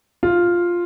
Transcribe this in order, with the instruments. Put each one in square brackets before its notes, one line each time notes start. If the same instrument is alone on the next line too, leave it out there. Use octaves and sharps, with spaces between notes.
[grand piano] F4